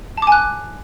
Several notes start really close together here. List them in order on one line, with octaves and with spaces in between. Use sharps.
A5 D6 G#5 F#6